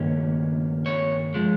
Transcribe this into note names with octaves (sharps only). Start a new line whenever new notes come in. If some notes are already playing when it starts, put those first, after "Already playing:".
Already playing: G2 D#3 A#3 C#4
C#5
F3 G#3